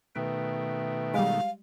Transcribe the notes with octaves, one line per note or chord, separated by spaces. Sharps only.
B2 D#3 A3 B4 E5 G5
G3 G#3 F5